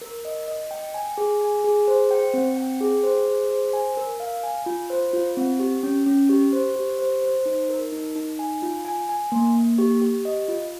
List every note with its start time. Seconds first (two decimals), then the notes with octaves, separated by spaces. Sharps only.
0.01 A#4
0.25 D#5
0.48 D#5
0.71 G5
0.94 G#5
1.18 G#4
1.41 G#5
1.64 G#4
1.88 C5
2.11 G5
2.34 C4
2.57 G5
2.81 G#4
3.03 C5
3.27 G#4
3.50 C5
3.73 G#5
3.97 A#4
4.20 F5
4.43 G#5
4.66 F4
4.90 C5
5.13 F4
5.37 C4
5.59 G4
5.83 C#4
6.06 C#4
6.29 G4
6.53 C5
6.76 G4
6.99 C5
7.22 C5
7.46 D#4
7.69 A#4
7.92 D#4
8.16 D#4
8.39 G#5
8.62 F4
8.85 G#5
9.09 G#5
9.32 A#3
9.55 A#3
9.78 G4
10.02 G4
10.25 D#5
10.48 F4